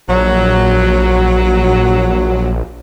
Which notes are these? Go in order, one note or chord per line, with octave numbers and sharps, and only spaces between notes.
A#1 F#3